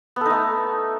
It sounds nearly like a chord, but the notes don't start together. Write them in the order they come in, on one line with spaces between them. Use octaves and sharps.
B3 A4 D#4 A3